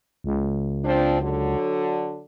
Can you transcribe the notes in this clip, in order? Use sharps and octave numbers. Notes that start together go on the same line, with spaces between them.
C#2
F3 C4 D4
D3 F#3